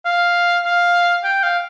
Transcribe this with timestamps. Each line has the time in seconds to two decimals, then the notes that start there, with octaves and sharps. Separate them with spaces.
0.05 F5
0.65 F5
1.24 G5
1.43 F5